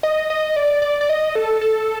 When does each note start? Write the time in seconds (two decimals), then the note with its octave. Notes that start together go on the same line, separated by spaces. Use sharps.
0.03 D#5
0.30 D#5
0.56 D5
0.82 D5
1.01 D5
1.09 D#5
1.35 A4
1.61 A4